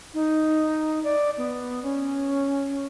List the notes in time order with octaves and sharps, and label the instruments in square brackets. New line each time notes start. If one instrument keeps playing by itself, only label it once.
[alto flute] D#4
D5
B3
C#4